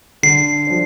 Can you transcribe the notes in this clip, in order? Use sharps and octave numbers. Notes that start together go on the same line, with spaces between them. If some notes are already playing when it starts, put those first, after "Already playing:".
D3 C7
F3 D4